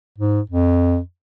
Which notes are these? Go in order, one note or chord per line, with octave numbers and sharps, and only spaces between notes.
G#2
F2